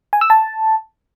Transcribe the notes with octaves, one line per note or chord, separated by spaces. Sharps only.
G#5
E6
A5